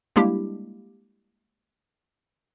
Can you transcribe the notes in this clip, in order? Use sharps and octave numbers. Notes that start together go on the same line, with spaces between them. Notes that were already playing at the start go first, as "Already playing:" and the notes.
G3 G#3 A#3 D4 E4 G4